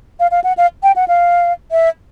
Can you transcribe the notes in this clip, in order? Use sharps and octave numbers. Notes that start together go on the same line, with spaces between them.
F5
F5
F#5
F5
G5
F#5
F5
E5